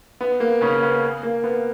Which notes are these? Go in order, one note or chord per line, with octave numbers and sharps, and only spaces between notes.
B3
A#3
C#3 C#4
B3
A#3
B3